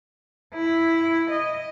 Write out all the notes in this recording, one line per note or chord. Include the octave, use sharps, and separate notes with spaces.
E4
D#5